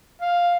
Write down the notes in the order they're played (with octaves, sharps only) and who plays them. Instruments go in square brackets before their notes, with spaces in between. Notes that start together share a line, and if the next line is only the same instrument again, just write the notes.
[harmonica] F5